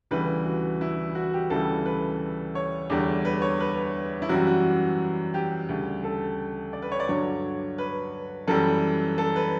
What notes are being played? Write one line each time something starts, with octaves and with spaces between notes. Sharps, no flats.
D2 C#3 E3 G3 B4
F#4
E4
F#4
G4
D2 C#3 E3 G3 A4
B4
C#5
E2 D3 G3
B4
C#5
B4
E4
F#2 E3 G3 F#4
F#4
G4
D2 C#3 G3
A4
D5
B4
C#5
D5
G2 D3 F#3 C#5
B4
F#2 E3 G3 A4
A4
B4